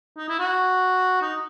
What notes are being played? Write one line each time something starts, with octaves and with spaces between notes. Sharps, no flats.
D#4
E4
F#4
D#4